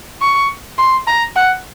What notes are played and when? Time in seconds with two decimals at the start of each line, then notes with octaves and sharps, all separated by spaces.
0.21 C#6
0.78 C6
1.07 A#5
1.36 F#5